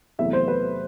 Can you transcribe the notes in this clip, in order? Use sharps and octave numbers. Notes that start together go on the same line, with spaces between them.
E2 C3 F#3 A3 E5
C5
B4